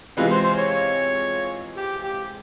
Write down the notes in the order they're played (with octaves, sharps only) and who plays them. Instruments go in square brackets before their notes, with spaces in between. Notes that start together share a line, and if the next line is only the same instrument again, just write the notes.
[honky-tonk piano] C3 E3 G#3 C4 F4 [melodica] B4
[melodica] C5
C5
C#5
C#5
G4
G4